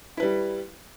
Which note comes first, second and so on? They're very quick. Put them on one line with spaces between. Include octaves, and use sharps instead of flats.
E4 B4 G3